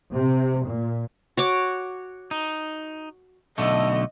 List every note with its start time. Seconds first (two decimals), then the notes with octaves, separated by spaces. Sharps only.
0.13 C3
0.65 A#2
1.37 F#4 C#5 D6
2.31 D#4
3.58 B1 D3 A3 D#5